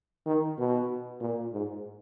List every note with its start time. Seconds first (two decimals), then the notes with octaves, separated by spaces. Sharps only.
0.26 D#3
0.58 B2
1.20 A#2
1.53 G#2